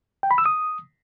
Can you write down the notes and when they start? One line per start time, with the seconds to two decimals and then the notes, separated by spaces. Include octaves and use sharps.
0.23 G5
0.31 B5
0.38 E6
0.46 D#6